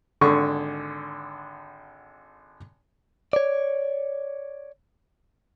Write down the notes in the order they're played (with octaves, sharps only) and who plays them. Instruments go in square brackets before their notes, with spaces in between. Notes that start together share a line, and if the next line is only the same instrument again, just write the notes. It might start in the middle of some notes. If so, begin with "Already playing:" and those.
[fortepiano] G#1 D3 C#6
[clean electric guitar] C#5 D5